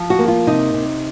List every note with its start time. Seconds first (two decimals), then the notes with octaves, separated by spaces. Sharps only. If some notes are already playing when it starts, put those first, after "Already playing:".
Already playing: F3
0.10 F#4
0.19 A#3
0.28 F4
0.47 C3 D#4
0.74 C3